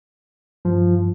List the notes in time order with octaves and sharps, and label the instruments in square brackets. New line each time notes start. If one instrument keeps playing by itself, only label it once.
[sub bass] G2 [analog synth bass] F3